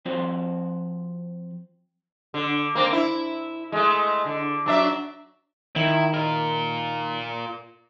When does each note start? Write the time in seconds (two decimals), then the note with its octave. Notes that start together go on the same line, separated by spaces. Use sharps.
0.05 F3 C4 F4 F#4 C5 C6
2.34 D3
2.75 A#3 C4 D4
2.93 E4
3.72 G#3 A3
4.25 D3
4.66 F#3 D4 E5
5.76 D#3 E4
6.14 F4 A#4